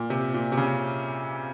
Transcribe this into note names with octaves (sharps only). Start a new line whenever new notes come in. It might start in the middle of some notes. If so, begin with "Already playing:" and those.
Already playing: A#2
C3
A#2
C3
C#3